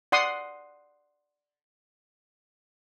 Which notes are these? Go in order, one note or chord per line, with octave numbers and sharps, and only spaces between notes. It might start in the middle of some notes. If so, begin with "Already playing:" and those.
D5 F#5 C6 D#6